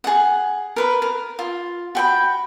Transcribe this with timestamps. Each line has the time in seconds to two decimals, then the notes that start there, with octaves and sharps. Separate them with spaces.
0.04 G#4 F#5
0.76 A#4 B4 B5
1.02 A#4
1.39 F4
1.95 F#4 G5 B5